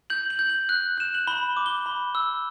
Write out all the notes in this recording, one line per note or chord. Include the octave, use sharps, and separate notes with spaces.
G6 F#7
F#7
G6
F#7
F#6
F#6 E7
F#7
B5 G7
D6
G7
B5
E6